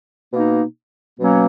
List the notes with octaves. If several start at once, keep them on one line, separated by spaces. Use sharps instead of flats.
B2 A#3 D#4
B2 F#3 A#3 C#4